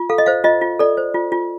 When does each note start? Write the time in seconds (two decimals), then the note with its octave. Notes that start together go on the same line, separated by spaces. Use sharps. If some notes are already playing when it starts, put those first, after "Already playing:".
Already playing: F4
0.10 A4 F5
0.18 D#5
0.26 C5 F5
0.44 F4 D#5
0.61 F4
0.80 A4 D5
0.97 C5
1.14 F4
1.32 F4